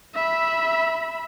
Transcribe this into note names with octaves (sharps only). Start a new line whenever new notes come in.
E5 B5